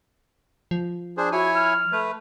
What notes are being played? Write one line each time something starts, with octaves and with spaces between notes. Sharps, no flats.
F3
D4 G#4 C5
E4 F#4 C#5 G#5
F6
A3 B4